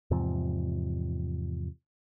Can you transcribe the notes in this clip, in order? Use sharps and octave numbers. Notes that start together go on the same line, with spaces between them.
E2 G#2 C3 F3